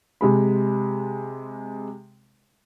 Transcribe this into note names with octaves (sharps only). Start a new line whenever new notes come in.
C3 G#3 B5